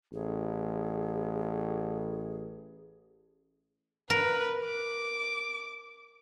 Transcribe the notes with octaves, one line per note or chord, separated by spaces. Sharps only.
A1 G#4
A#4 B4
D6